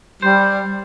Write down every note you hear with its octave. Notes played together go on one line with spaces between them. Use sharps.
G3 C5